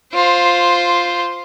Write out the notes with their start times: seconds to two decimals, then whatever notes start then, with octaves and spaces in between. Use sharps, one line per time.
0.14 F4 C5